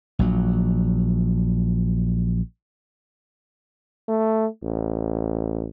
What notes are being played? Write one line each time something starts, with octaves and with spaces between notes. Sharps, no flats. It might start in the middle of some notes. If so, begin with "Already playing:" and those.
A#1 F#3
A3
A1